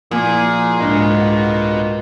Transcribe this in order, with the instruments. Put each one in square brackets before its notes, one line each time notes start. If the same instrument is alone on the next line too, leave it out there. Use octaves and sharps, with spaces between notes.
[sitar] A#2 [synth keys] F3 A#3 E4 [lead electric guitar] G#4 G#5
[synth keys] C2 D4 [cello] G#2 [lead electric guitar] B4 D#5